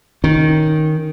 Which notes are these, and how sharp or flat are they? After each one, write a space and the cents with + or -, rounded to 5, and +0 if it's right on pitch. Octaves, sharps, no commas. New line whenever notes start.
D#3 +0 C#4 +0